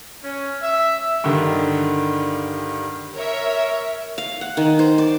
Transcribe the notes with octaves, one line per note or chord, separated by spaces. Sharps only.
C#4
E5
G2 D3 D#3
A#4 C#5 E5
F5
F#5
D#3
C5
D5